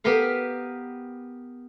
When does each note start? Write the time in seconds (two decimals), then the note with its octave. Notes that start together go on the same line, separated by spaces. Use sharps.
0.04 B3 G4 A#4 B4 F5